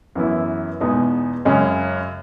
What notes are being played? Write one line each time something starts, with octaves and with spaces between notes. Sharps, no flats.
F#2 E3 B3 E4
E2 B2 G#3 B3 D#4
F#2 C#3 G#3 C#4